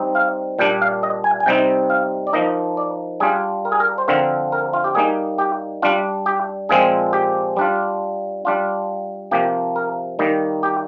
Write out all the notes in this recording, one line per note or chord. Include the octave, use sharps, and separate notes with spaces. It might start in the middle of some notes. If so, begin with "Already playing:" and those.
Already playing: G3 C4 D#4
F5
A#2 G3 D4 G5
F5
D#5
G#5
G#5
C3 G3 C4 D#4 G5
F5
D5
F3 A#3 D#4 D#5
D5
G3 D4 F4 G#4
A#4
G#4
A#4
C5
D3 F3 C4 F4 A#4
A#4
F4
G4
G3 A#3 D#4 G#4
G4
G3 D4 F4
G4
A#2 F3 G#3 C4 G#4
G4
G3 D4 F4
G3 D4 F4
C3 F3 A#3 G4
A#4
D#3 G3 A#3 D#4
G4